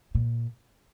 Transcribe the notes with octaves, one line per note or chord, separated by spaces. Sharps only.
A#2